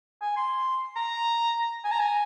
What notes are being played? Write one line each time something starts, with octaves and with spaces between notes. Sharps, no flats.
G#5
C6
A#5
G#5
A#5
G#5